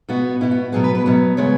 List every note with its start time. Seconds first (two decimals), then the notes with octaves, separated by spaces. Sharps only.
0.09 B2 B3 F#4
0.41 B2 B3 E4
0.51 F#4
0.72 B2 F#3 B3 G#4
0.84 B4
0.95 B4
1.06 B2 F#3 B3
1.37 C#3 G#3 B3 C#5